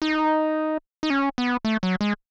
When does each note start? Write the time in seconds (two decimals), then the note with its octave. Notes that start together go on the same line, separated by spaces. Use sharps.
0.02 D#4
1.03 D#4
1.10 C#4
1.38 B3
1.65 A3
1.83 F#3
2.01 G#3